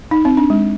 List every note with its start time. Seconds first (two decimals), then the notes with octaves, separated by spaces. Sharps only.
0.11 D#4
0.25 C4
0.37 D4
0.50 G#3